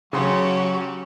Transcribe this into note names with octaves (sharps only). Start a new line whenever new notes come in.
C#3 F#3 C#4 F#4 G4 C6